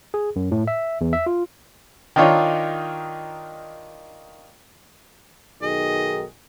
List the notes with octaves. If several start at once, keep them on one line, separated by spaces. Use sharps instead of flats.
G#4
F#2
A2
E5
E2
E5
F4
D#3 D4 D#4 F4 C#5
B1 D#3 G#4 D#5